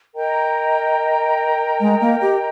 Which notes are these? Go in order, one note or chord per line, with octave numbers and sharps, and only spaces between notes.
A#4 D#5 G5 A#5
G#3
A#3
G4